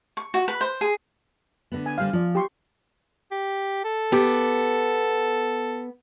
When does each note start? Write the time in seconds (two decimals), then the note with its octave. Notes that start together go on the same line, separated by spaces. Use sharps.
0.17 C#6
0.34 F#4
0.48 B4
0.61 C5
0.81 G#4
1.72 D3 B3
1.86 G#5
1.98 D3 G3 C5 F5
2.13 F3 F4 D5
2.35 G4 C6 C#6
3.32 G4
3.84 A4
4.12 B3 G4